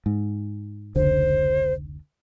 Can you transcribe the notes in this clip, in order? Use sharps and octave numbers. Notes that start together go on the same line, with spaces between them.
G#2
F1 C#2 D3 C5